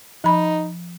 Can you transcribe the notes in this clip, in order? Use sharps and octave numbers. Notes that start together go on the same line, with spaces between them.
F3 D#4 B5